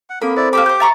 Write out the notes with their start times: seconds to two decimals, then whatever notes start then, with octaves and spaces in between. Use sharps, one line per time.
0.10 F#5
0.22 A#3 C4 A4 A#4 B5
0.37 E4 C5 D5
0.53 A#3 G4 A4 B5 D6
0.66 C5 G6
0.80 E5 A#5 C#6 A6